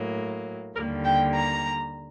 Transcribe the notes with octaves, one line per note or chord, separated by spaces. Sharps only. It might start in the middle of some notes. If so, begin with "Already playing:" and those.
Already playing: A2 F#3 A#3
D#2 D3 G3 A#3 A#4
G5
A#5